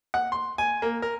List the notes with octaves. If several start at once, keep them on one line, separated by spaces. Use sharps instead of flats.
F#5
C6
G#5
A#3
A#4